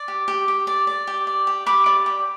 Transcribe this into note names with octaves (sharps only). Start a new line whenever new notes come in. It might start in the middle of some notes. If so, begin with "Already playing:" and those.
Already playing: D5
G4
G4
G4
D5
D5
G4
D5
G4
G4 B5 D6
D5
G4